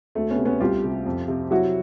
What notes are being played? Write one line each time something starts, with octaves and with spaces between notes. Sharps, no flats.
D2 A3
B3 C#4
C3
B3 C#4
C2 F4 G4
C3
F2
C3
F#3 E4 F#4